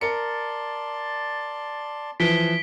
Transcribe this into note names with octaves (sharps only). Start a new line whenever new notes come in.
A#4 D5 A5 C6 C#7
E3 F3 B6 D7 G7